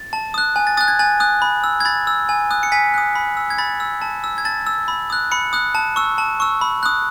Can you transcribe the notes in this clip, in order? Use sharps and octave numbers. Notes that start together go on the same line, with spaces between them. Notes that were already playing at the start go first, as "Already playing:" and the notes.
Already playing: A6
A5
D#6 F#6
G#5
A6
D#6 F#6 A6
G#6
G#5 A6
D#6 F#6
B5
E6
G#6
B5 A6
E6
G#5
D#6 F#6
C#7
G#5 B6
D#6 F#6
B5
E6
G#6
B5 A6
E6
A5
E6
G#6
A5 A6
E6
B5
D#6 F#6
B5 C#7
D#6 F#6
A5
C#6 E6
A5
C#6 E6
B5
D#6 F#6